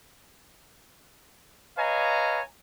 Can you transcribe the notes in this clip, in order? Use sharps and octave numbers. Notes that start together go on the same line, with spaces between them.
B4 C#5 D#5 F5 G#5 A#5